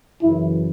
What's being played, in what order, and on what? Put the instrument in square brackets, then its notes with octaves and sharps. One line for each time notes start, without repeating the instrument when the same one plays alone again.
[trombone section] F#2 C#3 E3 E4